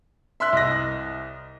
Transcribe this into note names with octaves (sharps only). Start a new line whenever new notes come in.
E5 C6 E6 F#6 B6
C2 D#5 A#6